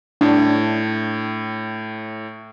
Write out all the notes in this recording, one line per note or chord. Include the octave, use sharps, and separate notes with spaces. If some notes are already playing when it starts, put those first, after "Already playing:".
A2 D4